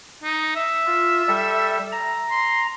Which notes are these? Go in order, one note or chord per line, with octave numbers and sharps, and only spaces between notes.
D#4
E5
F4
G3 A4
A#5
C6